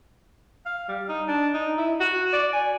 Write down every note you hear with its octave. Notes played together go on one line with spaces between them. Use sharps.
F5
G3
D#4
D4
D#4
E4
F#4
D5
G#5